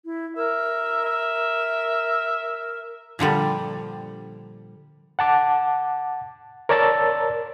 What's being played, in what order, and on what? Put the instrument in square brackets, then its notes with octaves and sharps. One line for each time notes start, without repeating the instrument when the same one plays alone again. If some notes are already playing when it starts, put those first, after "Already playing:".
[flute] E4
[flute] A#4 [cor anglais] E5
[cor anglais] E5
[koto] A#2 D3 F3 G3
[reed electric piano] F#5 A5 D6
A#4 C#5 D5 A5 E6 A6